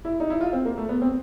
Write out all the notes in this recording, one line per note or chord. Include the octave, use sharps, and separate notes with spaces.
E4
D#4
E4
F4
C4
A#3
A3
B3
C4